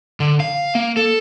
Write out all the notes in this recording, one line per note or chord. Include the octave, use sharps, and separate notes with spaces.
D3
F5
A#3
A4